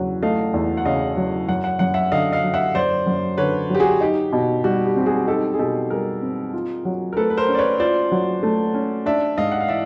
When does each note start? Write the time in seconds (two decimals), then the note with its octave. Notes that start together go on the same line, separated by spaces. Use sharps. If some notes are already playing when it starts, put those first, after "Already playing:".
Already playing: E2 C#3 F#3
0.22 A3 D#5 F5
0.54 E2
0.77 F#5
0.85 C#3 D#5 F5
1.17 F#3
1.48 F#2 F#5
1.64 F#5
1.79 F#2 F#5
1.94 E5 F#5
2.12 D3 D#5 F5
2.32 D#5 F5
2.44 F#3
2.54 E5 F#5
2.75 F#2 C5 D5
3.07 F#2
3.38 D3 B4 C#5
3.70 F#3 G4
3.80 F#4 G#4
4.01 D#4 G4
4.33 B2
4.64 G3 F#4
4.86 G4
4.96 C4 G4
5.06 F#4 G#4
5.27 D#4 G4 A4
5.54 G#4
5.59 B2 G4 A4
5.90 G3 G#4 A#4
6.22 C4
6.54 F4
6.85 F#3
7.13 A#4
7.16 A3 A4 B4
7.30 B4
7.37 A#4 C5
7.48 C#4
7.54 D5
7.59 B4 C#5
7.80 F4 C5 D5
8.12 F#3
8.43 A3
8.74 C#4
9.06 D4 D5 E5
9.37 G#2 D#5 F5
9.52 F#5
9.60 F5
9.68 E3 D5 E5